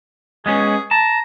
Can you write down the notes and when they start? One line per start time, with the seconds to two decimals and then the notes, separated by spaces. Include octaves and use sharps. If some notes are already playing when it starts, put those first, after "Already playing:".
0.46 G#3 B3 C#4 G#4
0.91 A5 A#5